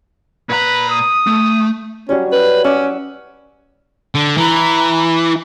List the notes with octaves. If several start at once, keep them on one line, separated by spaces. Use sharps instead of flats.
A#2 B4 A#5
D#6
A3
F#3 G3 C#4 C#5
B4
C#4 F#5 D6 E6
D3
E3 E4 A#5